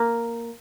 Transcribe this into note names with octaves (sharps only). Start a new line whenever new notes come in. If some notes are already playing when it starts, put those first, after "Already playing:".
Already playing: A#3